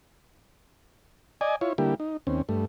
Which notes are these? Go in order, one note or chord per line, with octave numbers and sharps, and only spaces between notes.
D5 D#5 G#5
E4 F4 C#5
D3 G3 A#3 E4 G4
D#4
D#2 C4 C#4
G2 A3